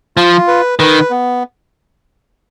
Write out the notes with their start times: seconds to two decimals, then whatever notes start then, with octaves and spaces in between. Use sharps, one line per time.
0.17 F3 F4
0.48 B4
0.79 D#3 B4
1.10 B3